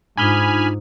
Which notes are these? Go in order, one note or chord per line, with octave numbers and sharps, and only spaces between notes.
G#2 D4 D#4 F4 G#5 B5 F6